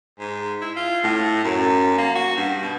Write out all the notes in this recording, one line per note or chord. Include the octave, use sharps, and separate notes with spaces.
G#2
E4
F4
A2
F#2
A#3
F#4
G2
B2